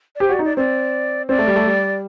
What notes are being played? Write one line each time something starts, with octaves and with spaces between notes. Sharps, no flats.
D5
G4 C5
F#4 D5
D#4
D5
C4 D5
C4 D5
A3
G3
A3
G3